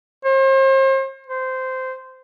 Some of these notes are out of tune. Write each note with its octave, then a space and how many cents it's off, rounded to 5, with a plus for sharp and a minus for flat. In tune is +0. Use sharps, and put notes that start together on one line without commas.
C5 +40
C5 -15